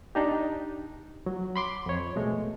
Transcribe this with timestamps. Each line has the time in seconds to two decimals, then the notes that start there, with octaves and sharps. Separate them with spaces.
0.15 D4 D#4 G4
1.26 F#3
1.56 B5 C6 D6
1.86 F2 C#5
2.16 B2 G#3 A3